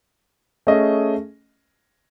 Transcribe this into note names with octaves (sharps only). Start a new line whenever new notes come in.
A3 C#4 G#4 D#5